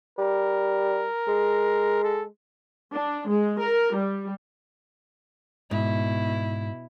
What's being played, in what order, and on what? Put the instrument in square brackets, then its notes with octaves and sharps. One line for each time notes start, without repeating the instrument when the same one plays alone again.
[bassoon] G3 [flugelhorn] A#4
[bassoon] G#3
[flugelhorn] A4
[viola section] D4
G#3
A#4
G3
[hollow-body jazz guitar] G#2 [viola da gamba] B2 E4